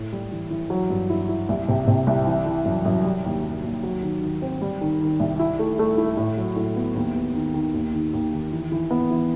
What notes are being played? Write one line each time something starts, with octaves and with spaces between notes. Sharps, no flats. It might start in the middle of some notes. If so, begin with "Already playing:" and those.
Already playing: A2
G3
E3
E3
F#3
G2
E4
E4
C2
C3
C3
C2
E3
E3
F#2
F#2
G3
D#2
G3
D#2
F#3
D#3
D#3
C4
G3
D#3
D#3
C2
E4
A3
A3
E4
A2
F#3
A2
B3
D#2
B3
D#3
D#3
D#2
D#3
D#2
D#3
E3
E3
B3
E3